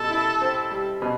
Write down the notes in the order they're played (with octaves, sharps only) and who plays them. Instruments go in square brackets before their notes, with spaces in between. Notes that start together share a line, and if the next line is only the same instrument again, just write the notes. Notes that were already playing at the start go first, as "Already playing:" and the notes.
Already playing: [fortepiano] B2 G3 [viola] A4
[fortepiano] E4
C4
G3
B2